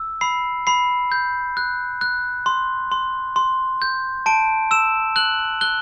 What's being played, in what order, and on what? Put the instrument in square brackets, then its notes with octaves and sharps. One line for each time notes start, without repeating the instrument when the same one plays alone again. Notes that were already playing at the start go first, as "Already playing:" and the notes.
Already playing: [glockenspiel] E6
B5 C7
B5 C7
G6
F#6
F#6
C6
C6
C6
G6
A5 D7
E6 E7
F#6 F#7
F#6 G7